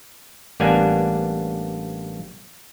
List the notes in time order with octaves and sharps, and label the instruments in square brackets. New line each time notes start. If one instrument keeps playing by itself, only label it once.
[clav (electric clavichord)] A1 G3 A#3 B3 D4 G#5